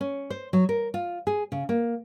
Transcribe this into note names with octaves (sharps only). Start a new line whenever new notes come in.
C#4
C5
F#3
A#4
F4
G#4
C#3
A#3